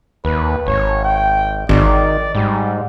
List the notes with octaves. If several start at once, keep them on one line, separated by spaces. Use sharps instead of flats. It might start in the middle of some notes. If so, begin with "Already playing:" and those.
D#2 B4
G#1 C#5
G5
G#1 D#3 D5
G#2 G3